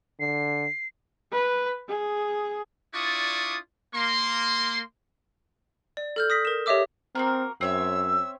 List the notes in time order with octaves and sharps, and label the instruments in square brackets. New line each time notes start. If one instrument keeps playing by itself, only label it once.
[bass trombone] D3 [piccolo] C7
[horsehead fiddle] B4
G#4
[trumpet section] D4 E4 F4 D5 C#6 D#6
A#3 C6
[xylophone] D5
A4 F6 G6
D#6 A#6 B6
A#4 E7
G4 C#5 D#5 E5 D6 E6
[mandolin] A#3 F#4 A#4 [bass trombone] C4
[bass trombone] F#2 [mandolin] C4 C#5 E5 [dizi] E6